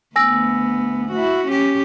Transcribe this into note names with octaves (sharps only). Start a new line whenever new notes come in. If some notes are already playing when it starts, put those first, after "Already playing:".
D2 B3 G#5 E6 A#6
E4 F#4
C#4 G4